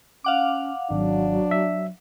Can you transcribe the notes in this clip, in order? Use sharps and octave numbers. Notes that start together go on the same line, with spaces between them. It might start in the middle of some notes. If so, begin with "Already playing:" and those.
C#4 F5 F#5 D6
G#1 F#3 D4
E5